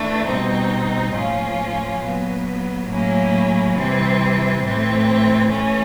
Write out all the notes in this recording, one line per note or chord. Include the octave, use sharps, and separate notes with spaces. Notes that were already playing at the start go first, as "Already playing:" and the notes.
Already playing: E3 A3 D4
B2 G3 C4 D#4
A2 F3 A#3 C#4 F4
A#2 F#3 B3
A2 F#3 A#3 C#4 E4
C3 E3 G3 C4
A2 E3 A3 C4
E3 A3 C#4